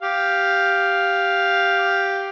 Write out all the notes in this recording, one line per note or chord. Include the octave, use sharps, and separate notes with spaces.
G4 F5